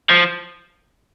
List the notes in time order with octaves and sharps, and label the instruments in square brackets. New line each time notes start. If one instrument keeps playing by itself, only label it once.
[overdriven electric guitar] F3